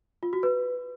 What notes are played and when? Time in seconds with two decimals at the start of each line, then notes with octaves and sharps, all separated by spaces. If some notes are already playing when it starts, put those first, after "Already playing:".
0.23 F4
0.33 F#4
0.43 B4